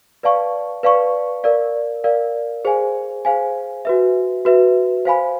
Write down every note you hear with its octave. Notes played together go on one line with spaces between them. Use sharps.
B4 D5 F5 A5 C#6
B4 D5 F5 A5 C#6
A#4 D5 F5
A#4 D5 F5
G#4 C5 F5 G#5
G#4 C5 F5 G#5
F#4 B4 E5
F#4 B4 E5
C5 F5 G#5 B5